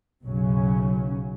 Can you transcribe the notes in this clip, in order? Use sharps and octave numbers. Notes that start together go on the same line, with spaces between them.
B1 F#2 C#3 F#3 C#4